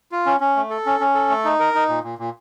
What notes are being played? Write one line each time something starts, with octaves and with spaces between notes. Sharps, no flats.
F4
C#4
C#4
A3
A4
C#4
C#4
A4
A3
D#4
A#4
D#4
A#2
A#2
A#2